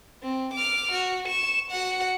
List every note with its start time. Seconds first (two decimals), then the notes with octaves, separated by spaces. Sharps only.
0.23 C4
0.54 D6 F6
0.92 F#4
1.25 C#6 E7
1.71 F#4 F#5